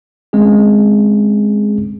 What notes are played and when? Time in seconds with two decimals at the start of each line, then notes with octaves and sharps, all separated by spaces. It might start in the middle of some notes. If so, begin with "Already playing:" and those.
0.33 G#3 C4 C#4 G#4